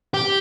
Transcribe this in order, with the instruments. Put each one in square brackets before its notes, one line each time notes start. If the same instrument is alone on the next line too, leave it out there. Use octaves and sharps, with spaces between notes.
[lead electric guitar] G4